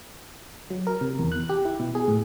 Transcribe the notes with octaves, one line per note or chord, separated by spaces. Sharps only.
F#3
A#4
C3
E2
F#6
G4
E4
B2
G#4
A2